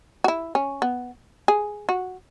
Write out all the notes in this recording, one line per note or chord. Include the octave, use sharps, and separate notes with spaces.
F#4
E4
C#4
B3
G#4
F#4